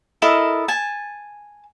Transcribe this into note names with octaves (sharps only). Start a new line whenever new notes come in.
E4 A4 A#4 D#5
G#5 A5